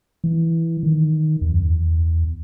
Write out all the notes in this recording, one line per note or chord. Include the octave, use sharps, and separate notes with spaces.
E3
D#3
E2
F#2
E2